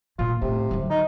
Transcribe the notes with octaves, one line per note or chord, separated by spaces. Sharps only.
A#2 F4
A2 C3
D3 F#3
D#4